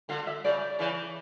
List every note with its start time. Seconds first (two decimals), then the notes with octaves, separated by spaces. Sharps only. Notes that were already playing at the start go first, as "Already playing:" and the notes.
0.09 D3 F5
0.27 E5
0.44 C#3 D5
0.79 C#3 E3